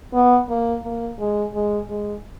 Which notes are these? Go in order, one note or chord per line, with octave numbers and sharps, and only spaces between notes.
B3
A#3
A#3
G#3
G#3
G#3